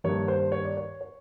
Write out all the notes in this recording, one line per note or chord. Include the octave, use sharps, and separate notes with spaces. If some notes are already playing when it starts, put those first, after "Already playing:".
G2 D#3 G3 A#3 C#5
C5
C#5
D5
C#5
C#5